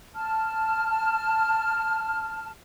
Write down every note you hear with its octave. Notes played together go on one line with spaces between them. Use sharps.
A5 F6